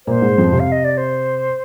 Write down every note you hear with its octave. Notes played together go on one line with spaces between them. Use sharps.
A#2 A#3 C5
G#2 G#3
F2 F3
C3
F5
D#5
D5
C5